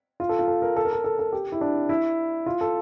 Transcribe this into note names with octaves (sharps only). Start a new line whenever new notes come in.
F4
A4
F4
A4
A#4
A4
A#4
A4
A4
A4
G4
E4
D4
E4
F4
A4